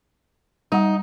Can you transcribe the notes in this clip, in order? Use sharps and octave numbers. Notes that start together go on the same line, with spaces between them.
G3 D#4 F#5